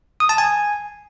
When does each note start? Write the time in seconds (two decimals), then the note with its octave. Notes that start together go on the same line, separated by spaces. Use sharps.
0.20 D#6
0.29 A5
0.38 G#5